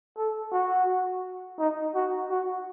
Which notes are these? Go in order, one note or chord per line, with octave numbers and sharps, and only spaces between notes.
A4
F#4
D#4
F#4
F#4